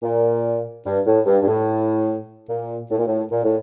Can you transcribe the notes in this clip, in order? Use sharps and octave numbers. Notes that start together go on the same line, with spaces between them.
A#2
G2
A2
G2
G2
A2
A#2
A2
A#2
A2
A#2
A2